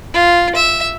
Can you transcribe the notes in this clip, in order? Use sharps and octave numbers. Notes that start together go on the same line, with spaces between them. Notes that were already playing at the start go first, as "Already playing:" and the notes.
F4
E5